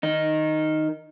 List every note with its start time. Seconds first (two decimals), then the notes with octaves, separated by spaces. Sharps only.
0.03 D#3 D#4